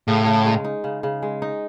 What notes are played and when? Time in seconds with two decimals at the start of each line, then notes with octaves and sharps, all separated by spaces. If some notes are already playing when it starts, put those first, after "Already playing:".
0.08 A2 C#3
0.26 C#3
0.45 G#3
0.64 D#4
0.84 C#3
1.03 C#3
1.22 G#3
1.42 D#4